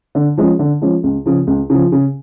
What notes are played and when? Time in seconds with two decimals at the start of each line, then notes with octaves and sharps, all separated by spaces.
0.15 D3
0.37 F3 G#3 C#4
0.59 D3
0.82 F3 G#3 C#4
1.03 C#2
1.26 C#3 F3
1.47 C#2
1.70 C#3 F3
1.92 C#3